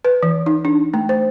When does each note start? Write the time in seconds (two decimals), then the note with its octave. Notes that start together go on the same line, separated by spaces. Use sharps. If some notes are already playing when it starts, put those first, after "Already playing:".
0.05 B4
0.23 E3
0.46 D#4
0.65 D4
0.94 A3
1.09 C5